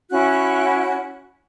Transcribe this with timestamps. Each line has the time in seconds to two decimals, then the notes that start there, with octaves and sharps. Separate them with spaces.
0.12 C#4 E4 F#4 F#6